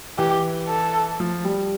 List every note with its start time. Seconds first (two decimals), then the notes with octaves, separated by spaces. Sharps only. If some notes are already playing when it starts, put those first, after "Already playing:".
0.18 E3 G4
0.68 A4
1.20 F3
1.45 G3